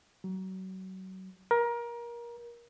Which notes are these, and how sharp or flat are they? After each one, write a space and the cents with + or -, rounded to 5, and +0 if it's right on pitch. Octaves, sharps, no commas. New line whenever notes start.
F#3 +30
A#4 +25